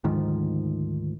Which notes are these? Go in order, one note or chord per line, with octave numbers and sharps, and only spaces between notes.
D2 G#2 D#3 F3